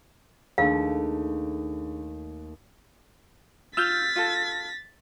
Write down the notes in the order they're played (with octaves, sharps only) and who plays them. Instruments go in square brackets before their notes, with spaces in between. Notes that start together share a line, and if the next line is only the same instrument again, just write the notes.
[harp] D#2 A3 [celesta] D4 G#4 [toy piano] F5
[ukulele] F4 [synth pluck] E6 F6 G6 [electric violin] A6 B6
[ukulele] F4 A4 A5